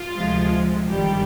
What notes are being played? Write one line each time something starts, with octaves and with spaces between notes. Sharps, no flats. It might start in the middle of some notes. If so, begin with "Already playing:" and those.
Already playing: F4
D2 C3 F3 G#3
G1 G2 D#3 G3 G4